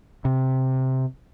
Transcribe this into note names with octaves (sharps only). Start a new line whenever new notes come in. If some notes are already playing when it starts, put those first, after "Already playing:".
C3